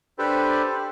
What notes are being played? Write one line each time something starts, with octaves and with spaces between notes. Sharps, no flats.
D4 G4 A4 B4 C5